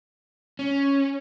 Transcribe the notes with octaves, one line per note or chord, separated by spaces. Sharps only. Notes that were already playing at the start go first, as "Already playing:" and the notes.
C#4